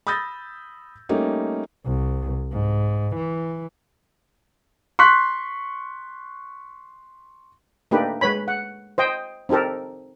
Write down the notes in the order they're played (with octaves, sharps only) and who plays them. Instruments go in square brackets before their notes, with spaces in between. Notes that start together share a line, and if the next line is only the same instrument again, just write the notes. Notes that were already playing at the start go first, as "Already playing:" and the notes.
[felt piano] B5 D#6 E6 G6 A6 A#6
G3 A3 A#3 C#4 D#4
[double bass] C2
G#2
E3
[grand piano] C6 C#6 F#6 B6
[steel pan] A3 A#3 D4 D#4 G4 B4
G#3 B4 C#5 B5
F#5
C5 D#5 G5
C4 D#4 G4 A4 A#4